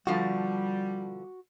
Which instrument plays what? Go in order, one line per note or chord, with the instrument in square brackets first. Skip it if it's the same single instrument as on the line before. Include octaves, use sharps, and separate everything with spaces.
[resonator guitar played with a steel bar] B2 D3 F3 [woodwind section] G3 [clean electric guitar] F#4